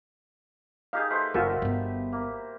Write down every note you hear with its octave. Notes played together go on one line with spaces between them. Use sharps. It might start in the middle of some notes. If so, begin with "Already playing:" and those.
D#4 G4 G#4 F5
A3 B4 C5
F#1 F4 F#4 A#4 E5
G1 B3
A#3